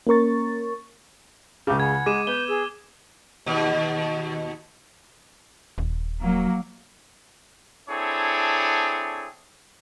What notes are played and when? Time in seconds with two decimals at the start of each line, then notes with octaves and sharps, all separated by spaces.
0.07 A#3 C#4 A#4 C#6 A6
1.67 C#2 C#3 D6 G6
1.80 F#5 G#5 B5 G#6
2.06 G#3 D6 D#7 E7
2.27 B3 G6 G7
2.48 G#4 E6
3.46 D#2 B2
5.78 D#1
6.21 F#3 A#3
7.89 C4 D4 E4 G#4 A4 C#5